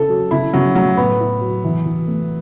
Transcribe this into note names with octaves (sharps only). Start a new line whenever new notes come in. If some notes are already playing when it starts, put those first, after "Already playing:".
Already playing: C#3 E4 A4
F#3
C#3 E4
C#3 F#3
F#3 A3
A2 B3
E4
F#3
E3
E3
A3